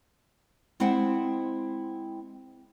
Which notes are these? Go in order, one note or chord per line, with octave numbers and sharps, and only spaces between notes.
G#3 C4 E4 C5 F#5 G5